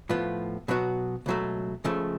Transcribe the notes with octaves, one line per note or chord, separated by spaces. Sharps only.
A2 F3 B3 F4
B2 F#3 B3 F#4
C#2 B2 F#3 A3
C#2 C#3 F3 A3